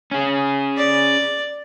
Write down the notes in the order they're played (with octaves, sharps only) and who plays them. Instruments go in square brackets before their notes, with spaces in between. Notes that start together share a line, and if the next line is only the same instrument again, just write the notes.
[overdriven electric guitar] C#4 G#4
[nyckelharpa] D5